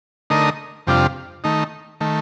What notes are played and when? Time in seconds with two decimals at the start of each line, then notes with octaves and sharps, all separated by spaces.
0.30 D3 A3 D#4 A#4 D#5
0.87 F2 C3 G3 D4 F4
1.44 D#3 A3 D#4
2.01 D#3 A3